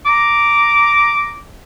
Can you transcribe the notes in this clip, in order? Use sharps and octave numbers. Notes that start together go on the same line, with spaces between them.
A#5 D6